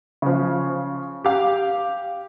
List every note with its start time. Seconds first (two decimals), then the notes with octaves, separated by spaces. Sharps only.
0.22 C#3 F3
1.24 G4 F5